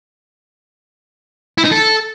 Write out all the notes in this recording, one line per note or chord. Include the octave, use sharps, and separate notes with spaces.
E4
D#4
A4